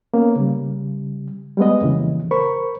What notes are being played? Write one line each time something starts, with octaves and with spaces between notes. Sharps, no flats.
A#3 B3 C#4
C#3 G3
G3 G#3 B3 D#5
F2 A#2 C#3 E3
A#4 C5 B5 C#6